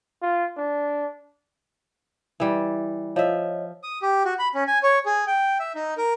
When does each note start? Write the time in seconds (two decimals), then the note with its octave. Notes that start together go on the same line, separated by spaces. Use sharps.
0.22 F4
0.57 D4
2.40 E3 G3
3.16 F3 C#5 D#5 E5
3.83 D#6
4.02 G4
4.25 F#4
4.39 B5
4.54 C#4
4.67 G#5
4.83 C#5
5.06 G#4
5.27 G5
5.60 E5
5.75 D#4
5.97 A#4